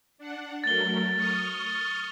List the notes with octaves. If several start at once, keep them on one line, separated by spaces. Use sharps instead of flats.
D4 F#5
F#3 A3 A#4 A6 G7
C#6 D#6 F6